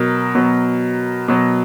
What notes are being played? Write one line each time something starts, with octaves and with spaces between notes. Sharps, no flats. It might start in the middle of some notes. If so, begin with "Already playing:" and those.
Already playing: B2 F#3 A#4
B2 F#3
B2 F#3